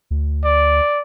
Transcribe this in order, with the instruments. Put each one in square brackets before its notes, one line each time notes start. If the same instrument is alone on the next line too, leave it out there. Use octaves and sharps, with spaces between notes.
[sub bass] D2
[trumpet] D5